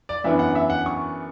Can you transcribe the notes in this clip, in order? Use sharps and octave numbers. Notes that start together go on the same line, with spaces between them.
D5
F#2 E3 B3 D4 E5
F#5
E5
F#5
C#6